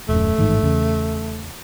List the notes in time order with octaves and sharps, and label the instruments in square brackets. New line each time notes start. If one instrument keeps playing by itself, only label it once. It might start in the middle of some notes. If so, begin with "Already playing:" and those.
[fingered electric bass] D#1 F#2 [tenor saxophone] A3
[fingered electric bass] A1 G#2 D#3
E2 C#3